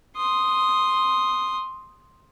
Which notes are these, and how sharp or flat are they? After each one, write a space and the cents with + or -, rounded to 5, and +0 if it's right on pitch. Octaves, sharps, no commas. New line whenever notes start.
C6 +0 D#6 +0